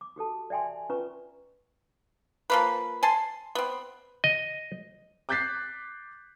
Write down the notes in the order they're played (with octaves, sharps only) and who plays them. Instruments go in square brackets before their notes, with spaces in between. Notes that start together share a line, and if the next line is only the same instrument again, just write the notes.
[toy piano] D6
F#4 G4 A4 A5
D5 E5 G5 G#5 C6
C#4 F4 B4 A#5 C#6
[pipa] F3 A#3 B4
G#5 A5 C6
B3 C4
[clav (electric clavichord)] D#5
[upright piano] D6 F#6 G6 A6 B6 C7